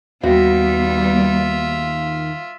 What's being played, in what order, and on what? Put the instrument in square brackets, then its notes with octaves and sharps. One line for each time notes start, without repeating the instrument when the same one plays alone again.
[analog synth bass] D#2 [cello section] G3 B3 [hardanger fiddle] F4 E5 [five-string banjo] F#4